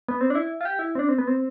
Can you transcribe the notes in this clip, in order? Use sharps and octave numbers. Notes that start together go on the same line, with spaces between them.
B3
C4
D4
E4
F4
G4
E4
C4
D4
C4
B3
C4